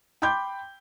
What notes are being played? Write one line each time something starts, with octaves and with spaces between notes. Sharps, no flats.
G5 B5 C6 D6 G6